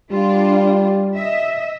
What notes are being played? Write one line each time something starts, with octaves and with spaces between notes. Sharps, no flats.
G3 D4 F4
D#5 E5